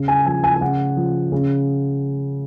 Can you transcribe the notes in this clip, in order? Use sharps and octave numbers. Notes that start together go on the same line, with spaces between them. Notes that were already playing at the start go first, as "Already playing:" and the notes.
Already playing: C#3
G#5
F3 G#5
G#5
G#5
C#3 F#5
F3
C#3